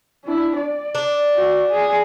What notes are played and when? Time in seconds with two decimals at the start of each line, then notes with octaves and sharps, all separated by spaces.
0.25 D4 E4
0.57 D5
0.95 D4
1.35 F#4
1.70 G#4